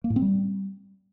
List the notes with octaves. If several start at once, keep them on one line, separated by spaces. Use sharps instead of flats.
A#3
A2
C4
G3